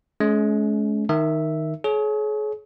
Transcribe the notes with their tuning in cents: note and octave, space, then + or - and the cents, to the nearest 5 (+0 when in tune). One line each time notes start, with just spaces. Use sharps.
G#3 +40 C#4 +20
D#3 +0 E5 +0
G#4 +40 C#5 +0